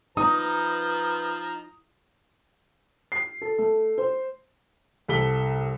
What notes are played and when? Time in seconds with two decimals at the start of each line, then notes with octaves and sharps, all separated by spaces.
0.17 F3 D#4 B4 A#5 D#6
3.12 C7
3.42 A4
3.58 A3
3.98 C5
5.08 C2 A4 B6 G7